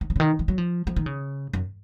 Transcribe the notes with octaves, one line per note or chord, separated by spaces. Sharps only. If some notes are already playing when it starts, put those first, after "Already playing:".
D#3
F3
C#3
D#3
F3
F#3
F3
F3
D#3
C#3
F#2